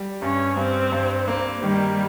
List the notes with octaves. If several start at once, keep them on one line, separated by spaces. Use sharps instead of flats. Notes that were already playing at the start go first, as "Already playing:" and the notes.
Already playing: G3
G2 C#4
G2 C4
G2
A#3
D#3 G3